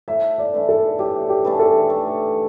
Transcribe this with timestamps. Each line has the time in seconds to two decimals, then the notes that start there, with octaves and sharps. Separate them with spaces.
0.08 A2 E5
0.38 D5
0.53 E3 A3 D4
0.69 A4
0.99 A2 G4
1.29 G4
1.45 E3 A3 D4
1.59 A4
1.90 A3